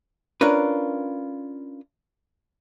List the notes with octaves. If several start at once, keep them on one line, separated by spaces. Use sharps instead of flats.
C#4 D4 F4 A#4 B4